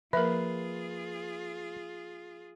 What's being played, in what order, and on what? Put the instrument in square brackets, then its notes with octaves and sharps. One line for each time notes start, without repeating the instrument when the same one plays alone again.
[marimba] F3 A#3 [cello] F4 G#4 [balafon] A#4 E5 [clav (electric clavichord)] B4